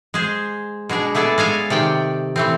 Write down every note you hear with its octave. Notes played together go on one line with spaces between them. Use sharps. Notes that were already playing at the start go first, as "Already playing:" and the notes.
G#3 G#4 C5
B2 G#3 D4 G#4
A3 B3 G#4 A4 D5
G#3 A4 F5 G#5
C3 D#3 D5 G5
E3 A3 C4